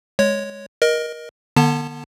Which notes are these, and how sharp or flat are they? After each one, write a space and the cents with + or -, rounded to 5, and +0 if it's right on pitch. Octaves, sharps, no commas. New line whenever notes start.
G#3 +0 C#5 +0
A#4 +25 D#5 +0
D3 +35 B3 -30 A5 +15